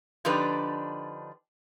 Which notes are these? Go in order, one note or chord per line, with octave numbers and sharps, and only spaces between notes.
D3 F3 D4 D#4 G4 B4